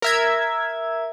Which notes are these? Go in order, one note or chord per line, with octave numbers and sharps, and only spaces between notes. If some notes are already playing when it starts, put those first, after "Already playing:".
A#4 E5 G#6